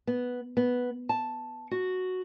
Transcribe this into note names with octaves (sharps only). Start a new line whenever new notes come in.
B3
B3
A5
F#4